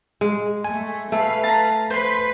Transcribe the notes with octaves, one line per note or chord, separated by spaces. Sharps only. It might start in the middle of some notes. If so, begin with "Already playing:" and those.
G#3
A3 G#5
A3 B4 F5
A5 A#5
B4 C5 C6